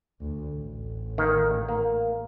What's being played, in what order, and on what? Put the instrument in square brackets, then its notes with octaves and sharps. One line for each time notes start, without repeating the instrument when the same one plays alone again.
[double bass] D2
A1
[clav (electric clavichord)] D#3 A#3
A#3